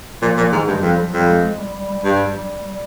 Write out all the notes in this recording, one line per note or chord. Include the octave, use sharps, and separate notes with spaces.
A#2 F3
A#2 F3
G#2 D#3
G2 G#3
F2 F3
G3
F3
F2 G3
G#3
G#3
G3
G3
G3
G2 G3
G3
G3